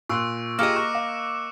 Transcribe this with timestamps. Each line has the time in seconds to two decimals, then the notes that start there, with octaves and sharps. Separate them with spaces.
0.09 A#2 C6 C#6 E6 F#6 D7
0.59 A#3 F4 G4 G#4 D#5 D6 C#7 E7
0.76 C#6 F#6
0.95 F5